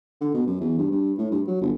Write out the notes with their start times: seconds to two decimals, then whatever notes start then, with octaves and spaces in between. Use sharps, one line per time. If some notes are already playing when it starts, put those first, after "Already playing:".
0.21 D3
0.34 B2
0.47 F#2
0.61 E2
0.78 G2
0.91 G2
1.18 A2
1.31 G2
1.47 F#3
1.61 G1